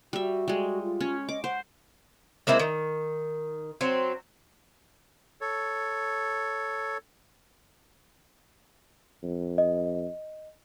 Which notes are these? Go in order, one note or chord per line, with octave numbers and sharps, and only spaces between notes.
G3 F#4 E5
G3 G#3
F4
C#4
D#5 D6
C5 F#5
G#3 A#3 C4 E4
D#3
F#3 C4
A4 C#5
F2
D#5